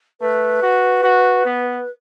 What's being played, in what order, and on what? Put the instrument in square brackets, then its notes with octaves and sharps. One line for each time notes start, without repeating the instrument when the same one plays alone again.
[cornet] A3 [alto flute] B4
[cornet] F#4
F#4
B3